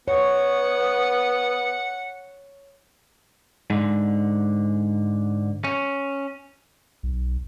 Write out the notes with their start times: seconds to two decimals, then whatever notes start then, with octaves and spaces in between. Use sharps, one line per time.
0.08 B3 C#5 F#5
3.70 G#2 D3
5.64 C#4
7.03 B1